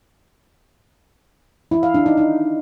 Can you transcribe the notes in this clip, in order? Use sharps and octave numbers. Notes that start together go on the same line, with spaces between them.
E4
F5
D4
D#4
D#4